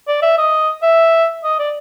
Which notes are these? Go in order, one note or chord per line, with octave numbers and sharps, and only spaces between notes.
D5
E5
D#5
E5
D#5
D5